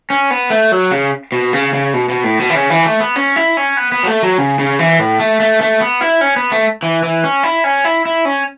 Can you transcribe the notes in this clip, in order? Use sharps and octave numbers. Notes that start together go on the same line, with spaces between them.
C#4
B3
A3
F#3
C#3
B2
C#3
C#3
B2
B2
A2
B2
E3
C#3
E3
A3
B3
C#4
E4
C#4
B3
B3
F#3
A3
F#3
C#3
C#3
E3
A2
A3
A3
A3
B3
E4
C#4
B3
A3
E3
E3
C#4
E4
C#4
E4
E4
C#4